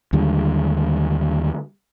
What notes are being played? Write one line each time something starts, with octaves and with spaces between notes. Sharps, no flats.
D#2 D3 G3 G#3